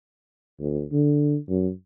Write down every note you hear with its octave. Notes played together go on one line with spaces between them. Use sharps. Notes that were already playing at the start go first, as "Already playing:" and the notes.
D2
D3
F#2